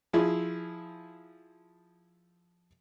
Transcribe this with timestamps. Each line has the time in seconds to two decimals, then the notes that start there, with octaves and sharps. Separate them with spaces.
0.13 F3 E4 G#4